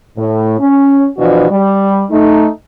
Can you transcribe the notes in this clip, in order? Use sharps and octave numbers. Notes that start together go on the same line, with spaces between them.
A2
C#4
B2 E3 F3 D4 F#4
G3
A3 D#4